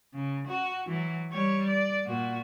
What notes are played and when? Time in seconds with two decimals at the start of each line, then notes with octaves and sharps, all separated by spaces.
0.13 C#3
0.48 F#4
0.86 E3 F#3
1.31 G3 C#5
1.67 D5
2.06 A#2 F#4